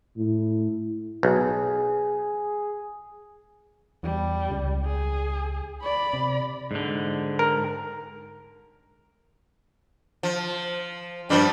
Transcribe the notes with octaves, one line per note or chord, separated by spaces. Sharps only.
A2
B1 G#4
E2 G3
C#2
G#4
D5 B5
C3
G#2 D3
A#4
F3
G2 F3 G3